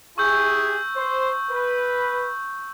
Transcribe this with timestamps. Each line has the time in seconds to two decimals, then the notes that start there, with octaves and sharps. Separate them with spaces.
0.18 E4 G4 G#4 C#6 E6 G6
0.96 C5
1.51 B4